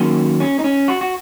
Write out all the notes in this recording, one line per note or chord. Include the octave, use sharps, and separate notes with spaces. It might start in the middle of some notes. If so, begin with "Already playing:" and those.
Already playing: D#2 D#3 F#3 A#3 C#4
C#4
D#4
C#4
F#4
F#4